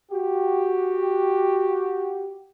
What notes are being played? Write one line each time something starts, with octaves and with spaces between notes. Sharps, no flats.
F#4 G4